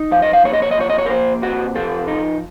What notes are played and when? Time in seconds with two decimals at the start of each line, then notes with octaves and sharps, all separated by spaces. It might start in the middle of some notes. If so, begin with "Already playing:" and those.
Already playing: D#4
0.11 F3 F5
0.22 D#5
0.33 F5
0.45 A#3 C#5
0.53 D#5
0.62 C#5
0.71 D#5
0.77 F3 C#5
0.90 D#5
0.98 C#5
1.06 A#4
1.09 A#3 C5
1.42 C3 F#4
1.75 F3 A4
2.07 D#4